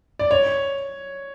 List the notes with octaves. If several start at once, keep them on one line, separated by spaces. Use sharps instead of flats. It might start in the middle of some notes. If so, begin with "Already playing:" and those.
D5
C#5